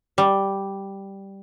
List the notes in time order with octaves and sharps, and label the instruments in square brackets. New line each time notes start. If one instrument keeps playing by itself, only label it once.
[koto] G3